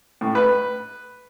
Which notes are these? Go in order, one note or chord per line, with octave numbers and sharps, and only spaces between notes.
A2
B4